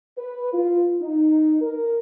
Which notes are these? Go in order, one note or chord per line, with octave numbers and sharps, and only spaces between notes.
B4
F4
D#4
A#4